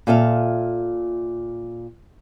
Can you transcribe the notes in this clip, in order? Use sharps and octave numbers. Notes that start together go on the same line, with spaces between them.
A#2 F4 A4 E5 F5